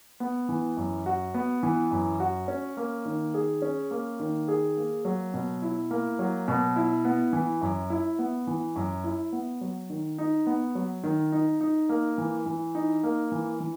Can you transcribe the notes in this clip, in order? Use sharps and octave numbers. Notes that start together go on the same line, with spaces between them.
B3
E3
F#2
F#4
B3
E3
F#2
F#4
C#4
A#3
D#3
G#4
C#4
A#3
D#3
G#4
A#3
F#3
B2
E4
A#3
F#3
B2
E4
B3
E3
F#2
E4
B3
E3
F#2
E4
B3
F#3
D#3
D#4
B3
F#3
D#3
D#4
D#4
A#3
E3
E3
D#4
A#3
E3
E3